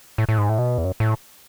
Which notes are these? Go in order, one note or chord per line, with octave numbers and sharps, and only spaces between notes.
A2
A2
G#2
A2
B2
E2
F#2
A2